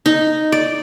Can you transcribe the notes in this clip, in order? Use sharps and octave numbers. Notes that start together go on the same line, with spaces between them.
D#4
D5